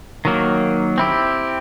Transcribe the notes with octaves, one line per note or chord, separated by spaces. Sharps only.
D#3 F#3 A#3
C4 E4 G4